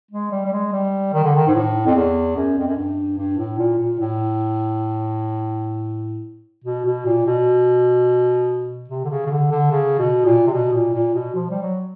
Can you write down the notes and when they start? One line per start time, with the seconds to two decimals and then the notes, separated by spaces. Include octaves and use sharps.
0.11 G#3
0.32 G3
0.46 G3
0.52 G#3
0.73 G3
1.14 D#3
1.25 D3
1.36 D#3
1.48 G#2
1.55 A2
1.86 F2
1.95 E2
2.36 F#2
2.58 F2
2.67 F#2
2.77 G2
3.18 G2
3.38 A2
3.58 A#2
3.79 A#2
3.99 A2
6.65 B2
6.85 B2
7.06 A#2
7.27 B2
8.90 C3
9.05 D3
9.10 C#3
9.26 C#3
9.31 D3
9.51 D3
9.71 C#3
9.99 B2
10.26 A#2
10.47 C3
10.53 B2
10.74 A#2
10.94 A#2
11.14 B2
11.35 F3
11.51 G3
11.62 F#3